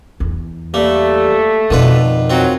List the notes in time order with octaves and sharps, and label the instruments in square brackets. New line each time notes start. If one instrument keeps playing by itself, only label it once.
[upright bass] E2
[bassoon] G3 [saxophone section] A3 [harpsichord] A#3
[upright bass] F2 B2 [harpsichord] D3 F4 B4 [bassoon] D#3
[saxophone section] F#3 [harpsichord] C4 F4